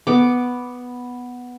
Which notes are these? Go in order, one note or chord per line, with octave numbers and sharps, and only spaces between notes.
B3 D6